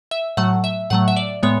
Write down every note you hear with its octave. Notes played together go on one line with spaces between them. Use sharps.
E5
A2 F#3 A3 F#5
E5
A2 F#3 A3 F#5
E5
D5
A2 G#3 B3 C#5